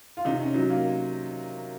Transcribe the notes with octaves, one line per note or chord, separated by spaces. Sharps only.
F4
C3 D#4
C#4
F#3 D#4
A#3